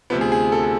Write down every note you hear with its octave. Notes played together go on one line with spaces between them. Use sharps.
D2 C3 F3 B3
G#4
G#4
A4
G#4